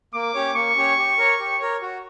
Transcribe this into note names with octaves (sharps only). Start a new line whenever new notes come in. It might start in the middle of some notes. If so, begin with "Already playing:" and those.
A#3 D6
C#4 G4 C#5
A#3 C#6
C#4 G4 C#5
G4
A#4 C#5
G4
A#4 C#5
F#4